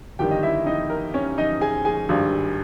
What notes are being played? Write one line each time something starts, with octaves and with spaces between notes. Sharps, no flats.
G1 G2 D#3 G3 G4 G5
D#5
E4 E5
D#4 D#5
A#4
C#4 C#5
D#4 D#5
G#4 G#5
G#4 G#5
G#1 G2 G3